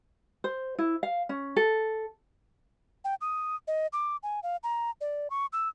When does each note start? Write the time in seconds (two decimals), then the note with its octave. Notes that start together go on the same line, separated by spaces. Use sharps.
0.44 C5
0.78 E4
1.03 F5
1.29 C#4
1.56 A4
3.05 G5
3.21 D#6
3.68 D#5
3.93 D6
4.23 G#5
4.43 F5
4.63 A#5
5.01 D5
5.30 C#6
5.53 E6